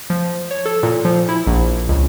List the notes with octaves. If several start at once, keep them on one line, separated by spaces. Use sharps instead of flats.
F3
C#5
A4
A#2
F3
E4
A#1
C#2